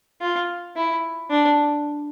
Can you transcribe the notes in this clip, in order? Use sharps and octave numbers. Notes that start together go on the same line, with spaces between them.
F4
E4
D4